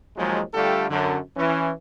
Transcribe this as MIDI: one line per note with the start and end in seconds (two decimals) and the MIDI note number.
0.17 0.41 39
0.17 0.41 53
0.17 0.41 54
0.17 0.41 56
0.54 0.89 50
0.54 0.89 55
0.54 0.89 57
0.54 0.89 65
0.54 0.89 67
0.54 0.89 69
0.90 1.18 42
0.90 1.18 50
1.37 1.71 52
1.37 1.71 61